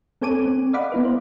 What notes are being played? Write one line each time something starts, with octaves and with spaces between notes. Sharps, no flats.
C4 A4 C#5 G#5 D6 D#7
C4
D5 D#5 F5 F#5 B5 D6
B3 E4 B4
C5